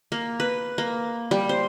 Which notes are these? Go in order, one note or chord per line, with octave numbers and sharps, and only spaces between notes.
A#3
B4
A#3
G3
C5